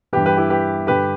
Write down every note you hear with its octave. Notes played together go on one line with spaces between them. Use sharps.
G2 E3 G4 B4
G4 B4
E4 G4
G4 B4
G2 D3 G4 B4